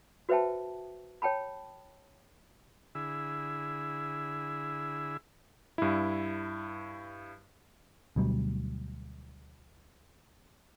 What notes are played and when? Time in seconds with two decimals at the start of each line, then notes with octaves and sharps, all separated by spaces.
0.29 F#4 B4 C5 E5 G5 A5
1.22 C#5 G5 A5 B5
2.95 D3 E4 G#4 B5 E6
5.78 G2 E4
8.16 D2 B2 F#3 G3